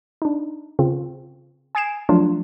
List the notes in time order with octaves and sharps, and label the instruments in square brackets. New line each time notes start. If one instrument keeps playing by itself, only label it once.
[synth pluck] D4 D#4
C#3 C4 F4
G#5 D#6 G#6 C7 D7 E7
F3 F#3 A3 D4 F4